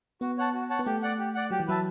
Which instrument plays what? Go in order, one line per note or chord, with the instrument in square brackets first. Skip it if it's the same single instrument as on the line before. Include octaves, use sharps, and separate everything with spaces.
[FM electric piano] B3 [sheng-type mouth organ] F#4
[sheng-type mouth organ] C#5 F#5 A5
F#4
C#5 F#5 A5
[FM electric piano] B3
[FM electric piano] A3 [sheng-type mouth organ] G4
[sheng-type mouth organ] D5 F#5
G4
D5 F#5
[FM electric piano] F#3 [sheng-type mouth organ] G4
[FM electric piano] E3
[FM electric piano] F#3 [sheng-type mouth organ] B4 E5 A5